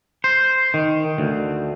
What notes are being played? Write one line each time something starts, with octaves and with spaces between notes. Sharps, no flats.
C5
D#3
D2